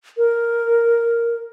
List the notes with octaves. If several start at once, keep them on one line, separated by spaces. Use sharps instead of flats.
A#4